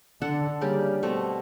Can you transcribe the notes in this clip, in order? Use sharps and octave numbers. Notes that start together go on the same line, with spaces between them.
D3 D4 A4 F#5
C#3 G3 A#3 G4 D5
B2 A3 C4